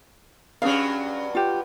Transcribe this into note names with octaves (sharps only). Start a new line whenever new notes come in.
G2 F#3 C#4 G#4 F5
F4 G4